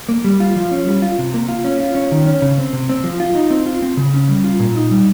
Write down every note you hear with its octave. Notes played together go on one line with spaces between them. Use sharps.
A#3
G3
F4
F3
C#4
G3
F4
C3
A#3
F4
C#4
F4
C#4
D#3
C#4
C#3
C4
C3
C4
F3
F4
D#4
C4
F4
C4
C#3
C#4
G3
F4
A#2
D#4
G3